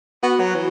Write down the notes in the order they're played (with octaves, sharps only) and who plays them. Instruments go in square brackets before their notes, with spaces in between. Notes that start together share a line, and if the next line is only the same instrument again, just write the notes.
[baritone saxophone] B3 [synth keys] F#4
[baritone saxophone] F#3
E3